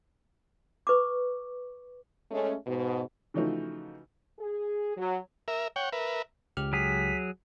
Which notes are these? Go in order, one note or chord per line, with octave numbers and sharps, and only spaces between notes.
B4 C#6 D6
G#3 A3 C#4
G#2 B2
C#3 E3 F3 A3 D#4 F#4
G#4
F#3
A#4 E5
C#5 F#5 G5
A#4 B4 E5
C#2 G4 F6
F#3 G#4 B6